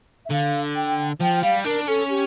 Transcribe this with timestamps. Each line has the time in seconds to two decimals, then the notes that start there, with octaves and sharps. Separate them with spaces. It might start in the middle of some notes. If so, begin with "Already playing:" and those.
0.24 E5
0.30 D3 F5
0.75 G5
1.20 F3 G5
1.42 G3 F5
1.64 D4 A#4
1.87 C#4 A4
2.09 G4